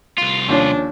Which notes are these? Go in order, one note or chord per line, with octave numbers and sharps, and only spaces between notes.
C2 F4
D#2 F3 C#4 D4